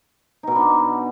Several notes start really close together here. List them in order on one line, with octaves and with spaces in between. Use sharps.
D#4 B2 B3 D4